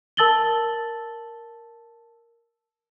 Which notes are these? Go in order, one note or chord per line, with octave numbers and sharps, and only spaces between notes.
A#4 A5 E6 A6 F#7 G7